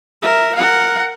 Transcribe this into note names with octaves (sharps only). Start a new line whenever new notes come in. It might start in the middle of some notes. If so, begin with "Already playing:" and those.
A#4 E5
A#4 F#5